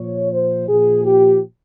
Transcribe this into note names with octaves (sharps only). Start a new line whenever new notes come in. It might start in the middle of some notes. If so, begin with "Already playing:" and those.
Already playing: A#2 F3 C#5
C5
A#2 F3 G#4
G4